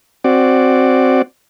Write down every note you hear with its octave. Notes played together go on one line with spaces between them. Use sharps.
C4 F#4 D5